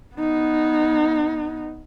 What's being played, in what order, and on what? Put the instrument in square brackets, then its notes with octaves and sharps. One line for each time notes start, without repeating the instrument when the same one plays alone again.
[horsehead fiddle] B3 D#4